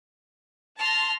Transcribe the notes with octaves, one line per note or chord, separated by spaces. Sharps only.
A5 C6 F6 A#6